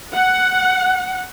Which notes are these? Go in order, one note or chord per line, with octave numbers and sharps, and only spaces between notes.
F#5